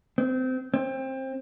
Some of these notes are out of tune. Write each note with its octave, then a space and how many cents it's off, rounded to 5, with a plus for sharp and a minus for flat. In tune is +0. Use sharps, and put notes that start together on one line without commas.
C4 -25
C4 +20